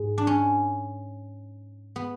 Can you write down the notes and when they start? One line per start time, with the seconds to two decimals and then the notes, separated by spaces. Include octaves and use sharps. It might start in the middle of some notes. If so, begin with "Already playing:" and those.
Already playing: G#2
0.18 D4
0.27 C#4
1.96 B3